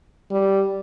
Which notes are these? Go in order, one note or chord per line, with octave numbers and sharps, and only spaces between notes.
G3